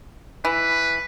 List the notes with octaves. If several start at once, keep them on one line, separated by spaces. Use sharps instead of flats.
E3 B4